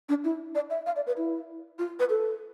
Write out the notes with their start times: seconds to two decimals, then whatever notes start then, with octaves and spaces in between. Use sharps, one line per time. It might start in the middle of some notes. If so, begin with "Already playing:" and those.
0.09 D4
0.24 E4
0.55 D5
0.70 E5
0.86 F5
0.96 D5
1.07 B4
1.17 E4
1.79 F4
2.00 B4
2.10 A4